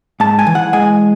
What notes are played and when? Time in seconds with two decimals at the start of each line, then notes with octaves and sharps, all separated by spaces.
0.20 G#2 A5
0.39 G#5
0.47 E3
0.55 F#5
0.73 G#3 G#5